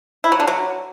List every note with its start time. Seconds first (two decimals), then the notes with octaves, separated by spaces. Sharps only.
0.24 E4
0.32 F#3
0.40 D3
0.47 F#3